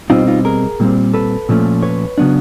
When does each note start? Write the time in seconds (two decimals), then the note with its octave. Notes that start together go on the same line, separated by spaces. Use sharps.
0.10 B2 G3 C4 D#4 F4
0.27 D#4 F4
0.45 G#4 A#4
0.80 A#2 G3 C4
1.14 A4 B4
1.49 A#2 F3 A3 C#4
1.82 B4 C#5
2.18 C#3 F#3 B3 D4